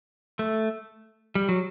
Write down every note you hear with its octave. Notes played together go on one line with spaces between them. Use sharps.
A3
G3
F#3